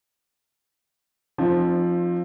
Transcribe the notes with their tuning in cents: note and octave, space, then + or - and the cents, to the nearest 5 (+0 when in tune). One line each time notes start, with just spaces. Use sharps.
F3 +0 C4 +20 D#4 -35